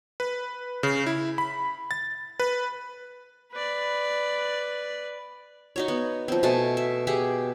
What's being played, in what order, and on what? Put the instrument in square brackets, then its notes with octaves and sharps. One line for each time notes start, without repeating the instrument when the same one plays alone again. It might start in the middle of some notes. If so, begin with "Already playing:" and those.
[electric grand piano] B4
C#3
E4
B5
A6
B4
[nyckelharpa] B4 D5
[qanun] D#4 F#4 C#5
B3
F3 C4
B2 A3 G#5 A5
E5
G4 G#4 E5 F#5